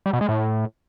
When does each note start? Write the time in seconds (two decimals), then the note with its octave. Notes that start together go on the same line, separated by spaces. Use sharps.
0.06 G3
0.13 B2
0.21 G#3
0.29 A2